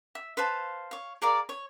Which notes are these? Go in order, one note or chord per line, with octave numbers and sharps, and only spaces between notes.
E5
B4 C5 F5 A5
C#5 F5
G#4 A#4 D5 F5
C#5